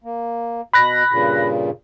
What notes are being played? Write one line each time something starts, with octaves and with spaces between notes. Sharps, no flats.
A#3
B2 B5 F#6 A#6
G2 A#2 C#3